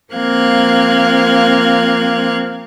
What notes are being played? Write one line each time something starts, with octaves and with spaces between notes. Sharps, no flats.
F3 A#3 C4 F5 F#6 G#6